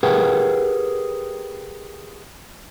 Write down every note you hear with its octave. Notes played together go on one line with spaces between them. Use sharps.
G4 G#4 A#4 B4 F#5 G5